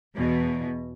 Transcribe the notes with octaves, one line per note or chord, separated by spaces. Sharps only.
E2 B2